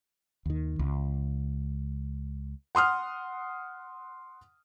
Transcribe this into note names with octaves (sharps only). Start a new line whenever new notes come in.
D#2 D#3
C#2
F#5 C6 D#6 F6